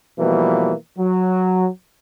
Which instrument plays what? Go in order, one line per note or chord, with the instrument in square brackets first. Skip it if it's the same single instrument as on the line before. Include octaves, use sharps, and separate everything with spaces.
[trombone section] B2 E3 F3 G3 A#3
F#3